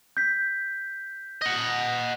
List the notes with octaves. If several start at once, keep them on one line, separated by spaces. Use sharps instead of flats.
G6 B6
D#5 F#5